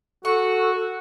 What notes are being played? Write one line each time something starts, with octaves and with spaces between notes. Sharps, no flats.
F#4 A4 C#6